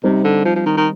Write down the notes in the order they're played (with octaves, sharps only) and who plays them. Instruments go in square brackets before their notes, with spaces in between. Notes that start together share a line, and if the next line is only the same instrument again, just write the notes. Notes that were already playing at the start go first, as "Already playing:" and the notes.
[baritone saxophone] C3 [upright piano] G3 C4 D#4
[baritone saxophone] D3
F3
F3
D#3
D#3